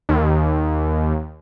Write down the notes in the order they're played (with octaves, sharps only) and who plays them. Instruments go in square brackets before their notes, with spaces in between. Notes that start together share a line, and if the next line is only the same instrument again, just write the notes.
[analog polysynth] D#2